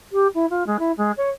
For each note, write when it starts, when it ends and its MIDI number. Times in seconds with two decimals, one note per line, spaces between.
0.12 0.27 67
0.34 0.46 64
0.50 0.63 65
0.66 0.77 56
0.79 0.92 64
0.97 1.11 56
1.17 1.29 73